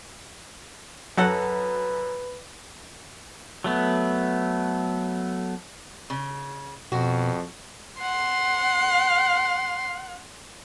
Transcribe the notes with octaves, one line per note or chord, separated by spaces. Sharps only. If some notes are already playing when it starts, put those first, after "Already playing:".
F#2 F#3 F#4 A4 B4 F#5
F#3 A3 B3
C#3
F2 B2 F#4
F#5 C6